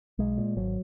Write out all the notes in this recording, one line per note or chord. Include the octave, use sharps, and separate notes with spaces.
B1 G#3
A#2
G#1 F#3